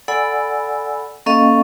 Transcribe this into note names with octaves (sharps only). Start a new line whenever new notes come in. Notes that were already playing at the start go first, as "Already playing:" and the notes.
A4 D5 F#5 G#5 B5 E6
A#3 C#4 A4 D#5 F5 C#6